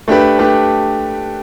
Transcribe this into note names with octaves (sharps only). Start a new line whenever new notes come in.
A3 D4 G4 B4
A3 D4 G4 B4